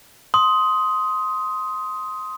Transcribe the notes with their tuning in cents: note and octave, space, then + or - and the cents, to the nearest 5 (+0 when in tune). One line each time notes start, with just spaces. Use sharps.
C6 +0 D#6 +15